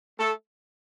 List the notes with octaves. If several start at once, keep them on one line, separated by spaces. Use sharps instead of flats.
A3 A4